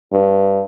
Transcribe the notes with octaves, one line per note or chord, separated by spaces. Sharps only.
G2